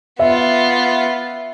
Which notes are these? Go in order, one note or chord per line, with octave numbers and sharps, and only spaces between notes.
B3 F4 E5